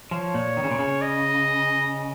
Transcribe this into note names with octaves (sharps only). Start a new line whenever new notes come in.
F3 C#5
A#2
D#3
C#3
A#2
C#3
D#5